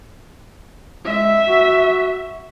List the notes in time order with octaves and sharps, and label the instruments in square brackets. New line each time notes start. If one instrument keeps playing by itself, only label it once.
[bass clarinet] G#3 [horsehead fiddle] E5
[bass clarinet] F#4